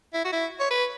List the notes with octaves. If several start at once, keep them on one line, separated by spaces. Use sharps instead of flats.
E4
F#4
E4
C#5
B4